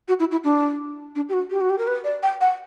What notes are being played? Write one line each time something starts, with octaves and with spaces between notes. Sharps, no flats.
F#4
E4
E4
D4
D4
G4
F#4
G4
F#4
G4
A#4
B4
D5
G5
F#5